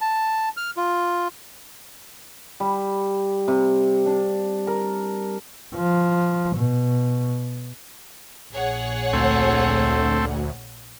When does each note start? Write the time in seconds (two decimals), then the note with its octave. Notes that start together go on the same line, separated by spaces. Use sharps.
0.01 A5
0.57 F6
0.77 F4
2.60 G3
3.48 C3
4.06 D4
4.67 A#4
5.74 F3
6.56 B2
8.53 A#1 G#4 C#5 F#5
9.13 D2 A3 C4